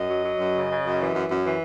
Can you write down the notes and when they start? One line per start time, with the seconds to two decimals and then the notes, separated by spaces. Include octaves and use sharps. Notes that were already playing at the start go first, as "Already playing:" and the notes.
Already playing: F#2 D#5
0.09 F#3
0.25 F#3
0.39 F#2
0.54 C#3
0.69 C#3
0.84 F#2
1.00 E3
1.14 F#2
1.30 F#2
1.44 E3